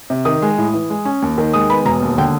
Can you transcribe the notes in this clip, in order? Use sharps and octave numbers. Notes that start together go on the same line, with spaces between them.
C3
D#3 D#6
G#3
A2
E3
G#3
C#4
D#2
D#3
G#3 D#6
B3 B5
E1 A#5
D#2
D3 G5